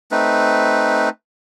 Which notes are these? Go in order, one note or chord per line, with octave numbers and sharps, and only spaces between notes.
A3 C4 D#4 B4